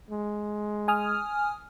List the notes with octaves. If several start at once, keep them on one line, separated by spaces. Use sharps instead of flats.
G#3
G#5 D#6 F6